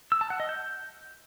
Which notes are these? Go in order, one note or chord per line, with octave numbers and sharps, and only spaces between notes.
E6
A5
F#5
D#5
G6